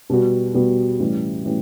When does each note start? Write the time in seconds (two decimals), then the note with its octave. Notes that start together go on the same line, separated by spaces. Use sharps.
0.10 B2 G3 B3 F#4
0.54 B2 G3 B3 F#4
1.00 A2 E3 G3 C#4 G4
1.45 A2 E3 G3 C#4 G4